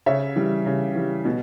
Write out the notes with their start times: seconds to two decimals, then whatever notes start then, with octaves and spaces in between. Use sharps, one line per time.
0.06 C#3 C#5 E5
0.36 E3 G3
0.66 C#3
0.95 E3 G3
1.25 B2